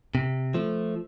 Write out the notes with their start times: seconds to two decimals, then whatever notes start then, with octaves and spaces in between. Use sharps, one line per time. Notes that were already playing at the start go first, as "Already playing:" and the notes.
0.15 C3
0.54 F3 A3